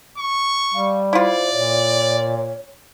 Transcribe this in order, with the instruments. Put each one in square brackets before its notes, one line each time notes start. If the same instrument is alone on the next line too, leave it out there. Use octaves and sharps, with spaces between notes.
[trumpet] C#6
[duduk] G3 [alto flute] F5
[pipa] E4 F4 [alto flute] C5 [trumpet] D5
[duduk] A#2 [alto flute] C#5